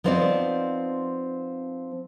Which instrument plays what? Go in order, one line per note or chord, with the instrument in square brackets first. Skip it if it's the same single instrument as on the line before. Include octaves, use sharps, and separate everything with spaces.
[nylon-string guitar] F3 B3 C4 D#4 C#5 D5